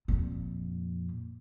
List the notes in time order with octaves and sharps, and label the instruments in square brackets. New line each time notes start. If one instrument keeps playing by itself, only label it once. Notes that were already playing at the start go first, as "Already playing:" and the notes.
[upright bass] F2 A#2